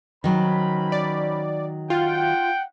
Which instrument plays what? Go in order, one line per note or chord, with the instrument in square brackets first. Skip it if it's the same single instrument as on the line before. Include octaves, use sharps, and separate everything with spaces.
[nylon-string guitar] D#3 F#3 [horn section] C#4 C5 B5
[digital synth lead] D5
[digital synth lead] F4 [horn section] F#5 G5